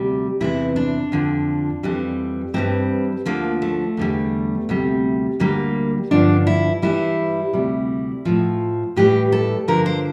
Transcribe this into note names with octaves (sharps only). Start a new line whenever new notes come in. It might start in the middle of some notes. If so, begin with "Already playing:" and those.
Already playing: D2 C3 G3
E2 C3 E3 E4
D4
F2 D3 F3
F2 E3 G3
G2 E3 G3 C4
D2 D3 F3 A#3
A3
E2 D3 G3
D2 C3 G3
D2 D3 G3 A#3
G2 D3 F3 D4
E4
G2 E3 G3 E4
D2 C3 G3
A2 F3
A2 E3 G3 G4
A4
G2 D3 F3 A#4
C5